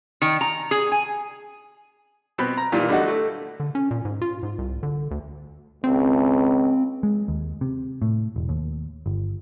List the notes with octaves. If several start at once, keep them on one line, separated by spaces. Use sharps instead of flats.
D#3
A#5
G#4
G#5
B2 B3 C4 B5
A#5
A#2 D#3 E3 G3 A#3
D3 G3 A3 D4 D#4 F#4
A3
D3
C#4
A#2
G#2
F4
G#2
C2
D3
D2
C#2 C4
G#3
D#2
C3
A2
E1
D#2
G1